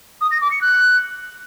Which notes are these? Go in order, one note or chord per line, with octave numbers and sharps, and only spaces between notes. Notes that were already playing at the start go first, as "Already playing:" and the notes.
D#6
A#6
D6
C#7
F#6